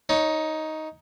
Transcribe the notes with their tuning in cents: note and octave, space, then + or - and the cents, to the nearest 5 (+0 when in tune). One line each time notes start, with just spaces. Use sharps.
D#4 +10 C#5 +0